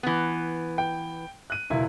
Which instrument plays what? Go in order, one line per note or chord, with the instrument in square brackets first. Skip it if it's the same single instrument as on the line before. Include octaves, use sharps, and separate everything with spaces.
[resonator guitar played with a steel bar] E3 B3
[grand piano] G5
F#6 D#7
E1 C#2 E4